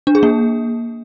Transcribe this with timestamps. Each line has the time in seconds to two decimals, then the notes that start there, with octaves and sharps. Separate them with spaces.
0.07 D4
0.15 G#4
0.23 A#3